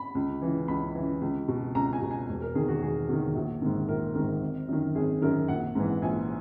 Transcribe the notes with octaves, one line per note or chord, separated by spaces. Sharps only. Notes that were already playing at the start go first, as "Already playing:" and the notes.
Already playing: B5
C#2
C#3 E3
C#2 B5
C#3 E3
C#2
B2
C#2 A#5
G#5
B2
G#5
E1
A#4
E2 D#3 G#4
F#4
E1 G#4
E2 D#3 F#4
A#1 F#4
G#2 D#3
A#1 A#4
G#2 D#3 A#4
G#1
F#2 D#3
G#1 G#4
F#2 D#3 A#4
A#1 F#5
G#2 E3
A#1 G#5